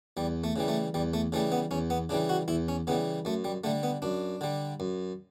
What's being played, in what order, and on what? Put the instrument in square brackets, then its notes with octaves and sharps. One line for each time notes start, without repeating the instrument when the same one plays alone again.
[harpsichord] E2 G3
A3
C#3 E3 G3
A3
E2 G3
A3
C#3 E3 G3 A3
B3
E2 C#4
B3
C#3 E3 G3 D4
F#4
E2 E4
C#4
C#3 E3 G3 B3
F#2 A3
G3
D3 G3 A3
B3
F#2 D4
D3 G3
F#2